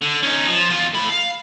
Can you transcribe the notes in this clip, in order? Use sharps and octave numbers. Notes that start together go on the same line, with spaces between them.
D3
C#4 D#4
F3
E2 F4
A2 B5
F5